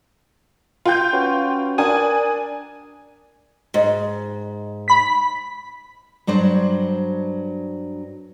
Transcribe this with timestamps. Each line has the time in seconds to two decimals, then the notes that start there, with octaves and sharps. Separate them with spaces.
0.85 F4 G5 G6
1.13 C#4 F#4 B4
1.78 D4 A#4 G#5 D#6
3.74 G#2
4.88 B5 B6
6.27 G2 F#3 D4 C5